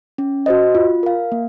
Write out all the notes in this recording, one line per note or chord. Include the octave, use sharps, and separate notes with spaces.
C#4
F#4 C5 D#5
F4
A#4 F5
A#3